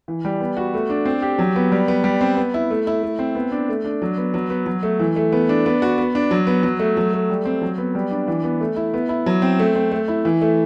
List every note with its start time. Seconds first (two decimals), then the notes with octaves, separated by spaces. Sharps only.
0.08 E3
0.25 G3
0.40 B3
0.57 F#4
0.74 A3
0.90 D4
1.05 C4
1.22 G4
1.39 F#3
1.56 B3
1.72 G3
1.88 B3
2.04 G3
2.21 C4
2.37 B3
2.54 E4
2.71 A3
2.87 E4
3.03 A3
3.19 C4
3.35 B3
3.52 D4
3.69 A3
3.84 D4
4.02 F#3
4.18 B3
4.34 F#3
4.50 B3
4.66 F#3
4.83 A3
4.99 E3
5.16 A3
5.32 B3
5.49 D4
5.66 B3
5.82 F#4
5.98 B3
6.15 D4
6.31 F#3
6.47 B3
6.63 F#3
6.79 A3
6.97 F#3
7.13 A3
7.30 G3
7.45 C4
7.62 F#3
7.78 B3
7.95 G3
8.11 D4
8.28 E3
8.44 B3
8.61 A3
8.76 E4
8.94 B3
9.09 E4
9.26 F#3
9.42 C4
9.59 A3
9.75 C4
9.92 A3
10.08 E4
10.25 E3
10.41 A3